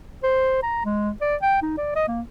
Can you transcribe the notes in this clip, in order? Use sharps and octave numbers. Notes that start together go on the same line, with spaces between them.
C5
A#5
G#3
D5
G5
D#4
D5
D#5
A#3